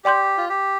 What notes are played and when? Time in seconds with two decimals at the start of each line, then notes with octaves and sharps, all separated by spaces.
0.04 G4 D5 G5 C6 G6
0.38 F4
0.49 G4